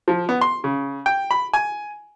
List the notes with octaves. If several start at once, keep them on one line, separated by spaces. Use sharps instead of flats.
F3
B3
C6
C#3
G5
B5
G#5